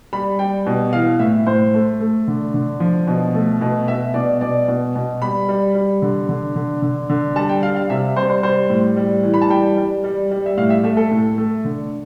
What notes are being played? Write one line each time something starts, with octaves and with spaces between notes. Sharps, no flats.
G3 B5
G3 G5
B2
E3 F5
A2 E5
A2 C5
A3
A3
D3
D3
F3
B2
A3
B2
B2 E5
B2 D5
B2 D5
B2
B2
G3 B5
G3
G3
D3
D3
D3
D3
D3
G3 A5
G5
G3 F5
F5
C3 E5
G3 C5
C5
G3 C5
A2
G3
E3
B5
A5
G3 G5
G3
G3
G3
E5
A2 F5
E5
A3 E5
A4
A2
A3
D3